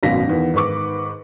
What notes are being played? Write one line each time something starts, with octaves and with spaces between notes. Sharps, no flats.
G#1 F#2 B2 F5 A#6 B6
E2 D#3
G#2 D#3 B4 C#6 D6